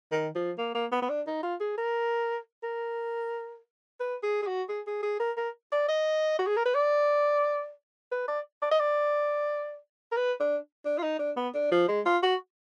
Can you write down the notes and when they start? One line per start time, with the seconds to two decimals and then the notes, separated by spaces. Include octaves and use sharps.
0.12 D#3
0.35 F3
0.58 A#3
0.74 A#3
0.92 B3
1.02 B3
1.09 D4
1.27 D#4
1.43 F4
1.61 G#4
1.78 A#4
2.63 A#4
4.00 B4
4.23 G#4
4.42 G#4
4.47 F#4
4.69 G#4
4.87 G#4
5.03 G#4
5.20 A#4
5.37 A#4
5.72 D5
5.89 D#5
6.39 F#4
6.47 G#4
6.57 A#4
6.65 B4
6.75 D5
8.12 B4
8.28 D5
8.62 D5
8.71 D#5
8.80 D5
10.12 A#4
10.17 B4
10.40 D4
10.85 D4
10.98 F4
11.03 D#4
11.19 D4
11.36 B3
11.54 D4
11.71 F3
11.88 G#3
12.06 F4
12.23 F#4